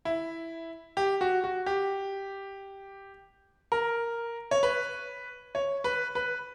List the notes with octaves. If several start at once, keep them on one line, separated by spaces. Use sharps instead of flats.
E4
G4
F#4
F#4
G4
A#4
C#5
B4
C#5
B4
B4